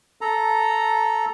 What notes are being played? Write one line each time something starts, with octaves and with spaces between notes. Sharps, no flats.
A4 A#5